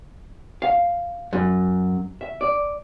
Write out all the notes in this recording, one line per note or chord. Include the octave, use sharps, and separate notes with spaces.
F5
F#2
E5
D5